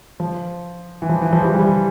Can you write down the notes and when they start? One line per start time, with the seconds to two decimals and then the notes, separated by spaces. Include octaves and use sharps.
0.20 F3
1.02 E3
1.09 F3
1.22 E3
1.33 F3
1.43 E3 G3
1.54 E3 G3